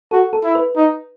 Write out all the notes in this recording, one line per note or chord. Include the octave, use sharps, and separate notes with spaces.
F#4 A4
A4
E4
B4
D#4